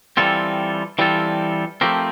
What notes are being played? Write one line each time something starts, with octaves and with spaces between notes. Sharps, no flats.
E3 G3 C4 F4 A4
E3 G3 C4 F4 A4
F3 A3 C4 G4 A#4